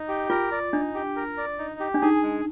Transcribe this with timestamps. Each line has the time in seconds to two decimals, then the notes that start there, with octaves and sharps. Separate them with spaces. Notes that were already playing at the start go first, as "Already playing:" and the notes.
Already playing: D#4
0.08 G4
0.30 F4 A#4
0.52 D5
0.73 D4 D#4
0.95 G4
1.16 A#4
1.37 D5
1.59 D#4
1.80 G4
1.94 D4
2.02 D#4 G#4
2.23 G#3